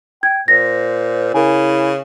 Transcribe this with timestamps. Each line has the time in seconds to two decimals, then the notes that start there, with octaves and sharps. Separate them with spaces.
0.23 G5 G#6
0.48 A#2 C5 A#6
1.34 C#3 E4 A#4 G#5